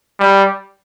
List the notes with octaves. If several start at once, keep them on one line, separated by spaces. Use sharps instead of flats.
G3